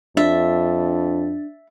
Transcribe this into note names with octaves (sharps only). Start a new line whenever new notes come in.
F2 D4 E5